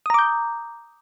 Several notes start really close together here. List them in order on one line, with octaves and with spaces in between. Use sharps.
D#6 A#5 D6 G6